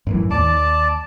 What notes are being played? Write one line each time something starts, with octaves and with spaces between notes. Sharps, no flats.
F#2 A2 E3
D#2 D5 A5